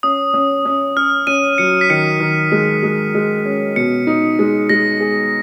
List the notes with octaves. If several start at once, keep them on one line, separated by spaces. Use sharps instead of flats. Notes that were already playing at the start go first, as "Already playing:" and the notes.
C#4 D#6
C#4
C#4
C#4 F6
C#4 D#7
F#3 C#7
B6
D#3 C#7
D#3
G#3
G#3
G#3
C#4
B2 C#7
D#4
G#3
G#3 A#6
G#4